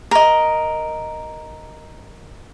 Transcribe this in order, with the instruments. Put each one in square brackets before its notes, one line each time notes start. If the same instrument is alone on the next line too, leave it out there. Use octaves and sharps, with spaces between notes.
[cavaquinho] A#4 D#5